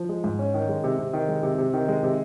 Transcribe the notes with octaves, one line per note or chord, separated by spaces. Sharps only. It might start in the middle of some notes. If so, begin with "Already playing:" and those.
Already playing: F3
G#3
G#2
C#4
D#3
G#3
C3
C3
D#3
G#3
C3
C3
D#3
G#3
C3